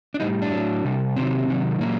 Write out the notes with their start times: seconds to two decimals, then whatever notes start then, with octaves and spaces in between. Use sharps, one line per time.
0.14 D4
0.20 A2 G3 D#4
0.42 D4
0.52 A2 F#3
0.85 C3 G3
1.16 C3 D#3 F#3 C4
1.48 C3 D#3 F#3
1.80 A#2 F#3 A#3